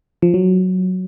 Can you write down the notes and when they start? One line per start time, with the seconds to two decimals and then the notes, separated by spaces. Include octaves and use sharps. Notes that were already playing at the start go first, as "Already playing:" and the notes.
0.22 F3
0.34 F#3